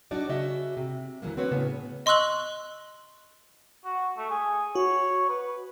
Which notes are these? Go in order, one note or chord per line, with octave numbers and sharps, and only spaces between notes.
F#3 D4 D#4 F#4 D5
C#3 F#4 D#5 E5
C3
D2 E3 F#3 A#3
C4 D4 F#4 B4 C#5
A2 C#3 B3
D#5 C6 C#6 E6 F#6 F#7
F#4
A3
G#4
F#4 C#5
B4